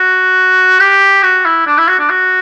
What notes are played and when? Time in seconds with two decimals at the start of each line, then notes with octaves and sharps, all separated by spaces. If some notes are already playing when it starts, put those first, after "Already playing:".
Already playing: F#4
0.80 G4
1.23 F#4
1.45 E4
1.67 D4
1.78 E4
1.88 F#4
1.99 D4
2.10 F#4